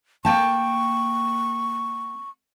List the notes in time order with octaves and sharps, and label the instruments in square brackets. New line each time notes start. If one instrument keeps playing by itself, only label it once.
[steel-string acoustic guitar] A#3 G5 A5 [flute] C#6